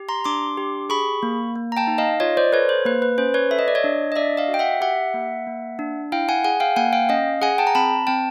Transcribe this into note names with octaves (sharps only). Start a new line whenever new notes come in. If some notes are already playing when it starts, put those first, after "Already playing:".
Already playing: G4
A#5 C6
D4 C6 D6
G4
G#4 B5 C#6
A#3
A#3
A#5
G5 A5
D#4
D#5 F5
F4 C#5 D#5
C5 D5
A4 B4 C#5
C5
A#3 B4
B4
C#4 C5
B4 C#5
A4 E5
D#5
D5
C#5 D#5
D4
D#5
D4 D5 E5
D#5 F5
F#4
G5
E5 F#5
G4 E5 F#5
A#3
A#3
D4
E4 F5 G5
F#5 G#5
G#4 F#5 G#5
F5 G5
A#3 F#5 G#5
F5 G5
C#4 D#5 F5
G#4 F#5 G#5
G5 A5
A#5
C4 A5 B5
C4 G5 A5